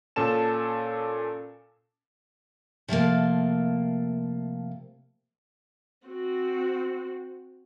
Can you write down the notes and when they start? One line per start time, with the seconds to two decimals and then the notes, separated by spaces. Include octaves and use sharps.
0.16 A#2 C#4 A4 A5 E7
2.88 C3 F3 A3 A#3
6.07 C4 F#4